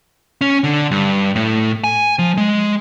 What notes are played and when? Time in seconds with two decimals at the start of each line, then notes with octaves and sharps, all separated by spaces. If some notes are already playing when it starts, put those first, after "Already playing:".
0.41 C#4
0.64 D3
0.91 G2
1.36 A2
1.84 G#5
2.19 F3
2.37 G#3